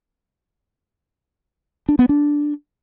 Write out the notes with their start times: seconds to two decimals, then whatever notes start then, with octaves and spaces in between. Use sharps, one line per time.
1.89 D4
1.99 B3
2.09 D4